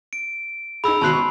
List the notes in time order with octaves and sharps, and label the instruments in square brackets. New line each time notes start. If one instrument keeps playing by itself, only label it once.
[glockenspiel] D7
[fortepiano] D#4 G#4 [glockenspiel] B5 E6
[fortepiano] G#1 B2 F#6 [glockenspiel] A5 C6 C7
[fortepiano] C#6